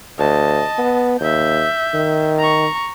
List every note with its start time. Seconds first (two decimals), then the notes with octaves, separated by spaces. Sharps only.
0.19 D2 D#5 A5
0.78 B3
1.20 D#2 E5 G6
1.94 D#3
2.39 A#5 C#6